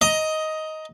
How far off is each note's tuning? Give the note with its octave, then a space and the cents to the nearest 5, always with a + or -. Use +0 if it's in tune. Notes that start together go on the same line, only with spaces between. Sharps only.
D#5 +10 A#5 +0